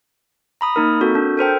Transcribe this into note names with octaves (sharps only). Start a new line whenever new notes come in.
A#5 B5 D#6
A#3 D#4 A#4
C4 F#4 A4 A#4
D4
A4 A#4 C5 G5